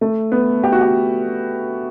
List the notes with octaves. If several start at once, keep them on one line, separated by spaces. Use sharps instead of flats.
A3
B3
G4
F#4
G4